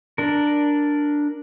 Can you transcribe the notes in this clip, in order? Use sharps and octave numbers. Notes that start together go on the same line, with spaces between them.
D4 A#4